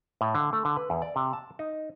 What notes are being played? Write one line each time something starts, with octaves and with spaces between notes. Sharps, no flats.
A2
D3
A3
D3
B4
E2
D5
C3
A5
D#4